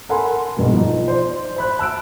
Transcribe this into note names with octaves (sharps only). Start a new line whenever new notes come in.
A4 A#4 F#5 G#5 B5 C6
B1 G2 B2
F3 D#4
C5 D5
C5 B5 F#6
A5 E6 F#6 D7